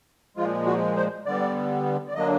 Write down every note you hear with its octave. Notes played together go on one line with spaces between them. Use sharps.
A#2 F3 G#3 F4
F#4
C5
D3 G3 B3 D5
D5
D3 F#3 A#3 D4 D#5